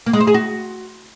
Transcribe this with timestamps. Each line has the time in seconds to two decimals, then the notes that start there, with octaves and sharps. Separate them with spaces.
0.06 A#3
0.13 G#3
0.20 C5
0.27 G#4
0.34 F#4